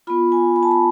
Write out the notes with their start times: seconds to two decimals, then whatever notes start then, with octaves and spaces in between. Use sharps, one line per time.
0.07 B3 F4 B5
0.32 G#5
0.56 B5
0.63 A5
0.71 B5